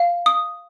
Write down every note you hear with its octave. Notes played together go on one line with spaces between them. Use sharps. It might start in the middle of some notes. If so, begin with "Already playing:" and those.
Already playing: F5
D#6